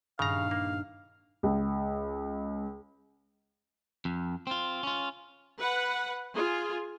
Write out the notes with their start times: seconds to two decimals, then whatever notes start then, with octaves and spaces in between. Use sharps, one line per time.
0.19 D#1 G2 C#3 F5 F#5 A#5
0.51 A#3
1.43 C#2
4.05 F2
4.47 C4 F4
4.83 C#4 F4
5.60 B4 F#5
6.34 F4 G#4